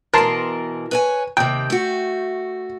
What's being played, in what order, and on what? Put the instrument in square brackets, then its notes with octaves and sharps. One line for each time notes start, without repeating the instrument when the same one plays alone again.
[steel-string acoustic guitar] B2 E3 [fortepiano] A#4 A5 C6
[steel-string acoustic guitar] B4 C#5 G#5
[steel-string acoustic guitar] D#2 C3 [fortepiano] G5
[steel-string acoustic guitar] A3 F#4